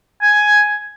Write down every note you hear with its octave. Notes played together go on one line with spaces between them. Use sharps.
G#5